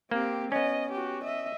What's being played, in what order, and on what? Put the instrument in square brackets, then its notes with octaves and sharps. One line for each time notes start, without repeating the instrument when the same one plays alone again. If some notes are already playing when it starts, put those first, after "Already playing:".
[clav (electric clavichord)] A#3 [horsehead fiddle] C4 G4
[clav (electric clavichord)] B3 C#4 [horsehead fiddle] D#5
[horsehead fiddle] F#4 G4
D#5 E5